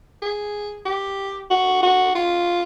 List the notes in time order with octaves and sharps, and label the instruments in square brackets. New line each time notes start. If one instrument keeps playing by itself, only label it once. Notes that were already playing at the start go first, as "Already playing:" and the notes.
[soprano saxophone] G#4
G4
F#4
F#4
F4